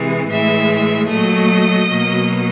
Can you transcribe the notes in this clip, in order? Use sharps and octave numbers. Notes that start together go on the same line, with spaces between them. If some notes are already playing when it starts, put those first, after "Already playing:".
Already playing: C3 E3 G#3
A2 E3 G#3 E5
A#2 F#3 A3 D#5
B2 F#3 A#3